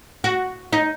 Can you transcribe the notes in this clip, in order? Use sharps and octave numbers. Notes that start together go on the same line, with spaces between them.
F#4
D#4